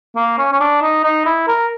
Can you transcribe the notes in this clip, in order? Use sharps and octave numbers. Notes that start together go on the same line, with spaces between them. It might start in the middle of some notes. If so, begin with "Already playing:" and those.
A#3
C#4
C#4
D4
D#4
D#4
E4
A#4